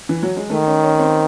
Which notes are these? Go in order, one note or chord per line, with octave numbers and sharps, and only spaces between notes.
E3
F#3
G#3
D#3 A3
C#4
C#4
C4